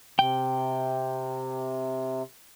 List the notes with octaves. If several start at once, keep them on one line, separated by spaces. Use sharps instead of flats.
C3 G5